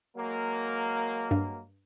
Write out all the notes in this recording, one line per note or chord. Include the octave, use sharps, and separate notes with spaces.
F#3 G#3 A#3
G2